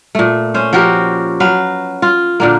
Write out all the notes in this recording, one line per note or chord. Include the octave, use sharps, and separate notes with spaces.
A#2 A3
C#4 C5
F3 F#4 G4 A#4
F#3 B4 F5
F4
A#2 D3 A#3